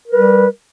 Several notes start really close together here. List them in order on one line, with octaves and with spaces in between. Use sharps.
A#4 B4 G3